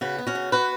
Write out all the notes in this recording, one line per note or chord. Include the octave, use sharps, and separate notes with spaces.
C#3 F#4 B4
B3
C#4 F#4
C#3
B3 F#4 B4